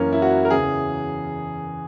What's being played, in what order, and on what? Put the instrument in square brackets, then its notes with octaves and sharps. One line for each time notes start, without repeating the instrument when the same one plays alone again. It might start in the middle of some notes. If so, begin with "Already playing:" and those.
Already playing: [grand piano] F#2 E3 A#3 C#4
E4
F#4
A#4
E2 C#3 E3 G#4